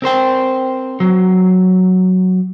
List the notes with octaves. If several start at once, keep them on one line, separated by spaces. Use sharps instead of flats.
C4 A#4 C5 G5
F#3